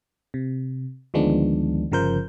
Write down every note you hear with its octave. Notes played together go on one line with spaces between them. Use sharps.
C3
D2 D#3 F3 G#3 B3 D4
G1 C#3 F3 A#4 C5 G6